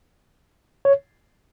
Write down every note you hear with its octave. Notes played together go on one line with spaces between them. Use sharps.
C#5